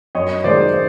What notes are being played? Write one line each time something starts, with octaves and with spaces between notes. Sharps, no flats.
F#2 C#5 D#5
D#3 G#3 C5 D5
C5